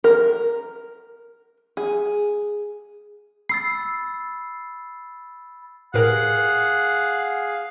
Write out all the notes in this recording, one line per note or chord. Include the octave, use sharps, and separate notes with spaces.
A#4
G#4
B5 E6 A6 C7
A2 G4 G#4 A#4 F5 F#5